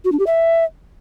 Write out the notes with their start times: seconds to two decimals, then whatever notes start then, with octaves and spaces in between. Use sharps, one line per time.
0.05 F#4
0.12 D4
0.19 G4
0.27 E5